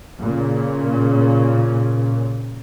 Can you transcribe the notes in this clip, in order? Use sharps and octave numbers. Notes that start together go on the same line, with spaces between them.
A#2 C#3